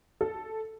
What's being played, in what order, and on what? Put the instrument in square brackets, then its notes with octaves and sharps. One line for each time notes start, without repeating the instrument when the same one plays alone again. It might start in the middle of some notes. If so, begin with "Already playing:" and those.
[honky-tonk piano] A4